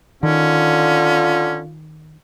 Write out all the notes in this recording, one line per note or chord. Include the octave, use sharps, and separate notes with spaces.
D3 D#3 C#4 F4